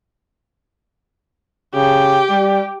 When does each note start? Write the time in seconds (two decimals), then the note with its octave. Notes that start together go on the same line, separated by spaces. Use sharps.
1.74 C#3 G4
2.30 G3